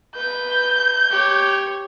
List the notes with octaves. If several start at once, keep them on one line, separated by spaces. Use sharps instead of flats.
B4 G6
G4 C#5